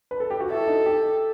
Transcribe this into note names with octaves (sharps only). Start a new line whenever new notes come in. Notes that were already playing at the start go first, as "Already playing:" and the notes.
B4
A4
G4
F#4
E4 A4
D#4
G4